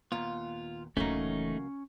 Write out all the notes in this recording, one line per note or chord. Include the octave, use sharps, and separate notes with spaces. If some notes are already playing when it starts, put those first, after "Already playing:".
D#2 A#2 B3 F4
D#1 C#2 E3 F#3 A3 A#3 C#4 D#4